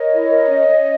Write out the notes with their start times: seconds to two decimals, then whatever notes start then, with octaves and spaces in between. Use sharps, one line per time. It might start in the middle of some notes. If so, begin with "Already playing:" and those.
Already playing: A#4 C#5 D#5
0.11 E4
0.30 A#4
0.49 C#4
0.68 C#4